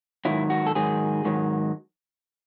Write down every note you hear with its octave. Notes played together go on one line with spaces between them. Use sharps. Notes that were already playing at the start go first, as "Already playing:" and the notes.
G#2 D#3 F#3 E4
F#4
A4
G#2 D#3 F#3 G#4
G#2 D#3 F#3